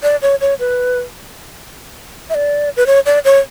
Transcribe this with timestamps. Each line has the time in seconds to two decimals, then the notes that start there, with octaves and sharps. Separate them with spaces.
0.03 D5
0.22 C#5
0.41 C#5
0.59 B4
2.30 E5
2.35 D5
2.77 B4
2.87 C#5
3.06 D5
3.25 C#5